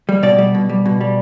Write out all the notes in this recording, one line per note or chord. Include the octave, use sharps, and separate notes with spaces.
G3
B2 D5
G3
B2
G3
B2
G3